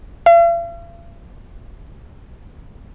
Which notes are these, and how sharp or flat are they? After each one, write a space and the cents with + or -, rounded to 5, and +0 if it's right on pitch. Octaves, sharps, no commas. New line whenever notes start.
F5 -45